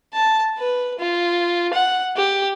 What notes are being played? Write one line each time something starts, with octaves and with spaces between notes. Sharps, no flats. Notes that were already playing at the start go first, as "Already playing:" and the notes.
A5
B4
F4
F#5
G4